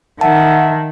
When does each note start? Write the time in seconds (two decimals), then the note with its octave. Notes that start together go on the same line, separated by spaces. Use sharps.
0.21 D#3 E5 F#5 A5